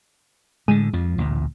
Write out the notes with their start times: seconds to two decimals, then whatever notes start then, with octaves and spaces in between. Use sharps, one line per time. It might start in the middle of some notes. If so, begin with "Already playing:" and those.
0.68 A2 D3 G#3 D#7
0.93 F2 F3
1.18 A1 D2 A#2